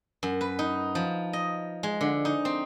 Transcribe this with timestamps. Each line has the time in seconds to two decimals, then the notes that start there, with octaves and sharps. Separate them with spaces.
0.23 F#2
0.41 B4
0.59 D#4
0.95 F3
1.33 D#5
1.83 G#3
2.01 D3
2.25 D#4
2.45 C4